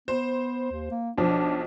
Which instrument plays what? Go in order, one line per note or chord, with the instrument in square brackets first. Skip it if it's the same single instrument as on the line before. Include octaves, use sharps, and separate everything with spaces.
[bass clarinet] B3 [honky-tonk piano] C5
[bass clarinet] D#2
A#3
[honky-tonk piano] B1 F3 [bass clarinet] D4